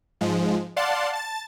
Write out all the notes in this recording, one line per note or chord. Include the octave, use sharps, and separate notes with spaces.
G#2 F3 G#3
D5 F5 F#5 A5 C6
A5 A6